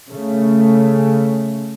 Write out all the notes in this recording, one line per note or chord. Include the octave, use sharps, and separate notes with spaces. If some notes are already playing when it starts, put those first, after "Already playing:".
C#3 A3